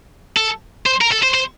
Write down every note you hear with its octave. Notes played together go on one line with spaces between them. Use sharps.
A4
C5
A#4
A4
C5
C5